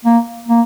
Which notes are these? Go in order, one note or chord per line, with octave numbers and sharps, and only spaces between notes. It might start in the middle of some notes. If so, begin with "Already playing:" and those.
A#3
A#3